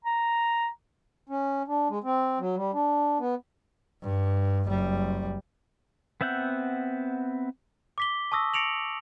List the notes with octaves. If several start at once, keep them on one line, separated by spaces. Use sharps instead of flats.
A#5
C#4
D4
G#3
C4
F#3
G3
D4
B3
G2
F#1 G3
B3 C4 E5 F#5 G6
D6 B6 G7
A5 C#6 D#6 E6 A#6
A#6 C#7 D7 F7 F#7